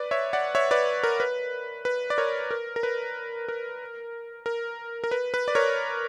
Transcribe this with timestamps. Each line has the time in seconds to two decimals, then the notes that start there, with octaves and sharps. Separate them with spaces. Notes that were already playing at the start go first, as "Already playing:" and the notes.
Already playing: B4 D5
0.11 C#5 E5
0.33 D5 F#5
0.55 C#5 E5
0.71 B4 D5
1.03 A#4
1.20 B4
1.85 B4
2.10 D5
2.18 A#4 C#5
2.51 A#4
2.76 A#4
2.83 B4
3.48 A#4
4.46 A#4
5.04 A#4
5.11 B4
5.34 B4
5.48 D5
5.55 A#4 C#5